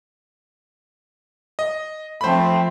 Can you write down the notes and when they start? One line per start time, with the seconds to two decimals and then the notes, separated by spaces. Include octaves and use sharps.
1.59 D#5
2.21 F3 A3 C4 C5 B5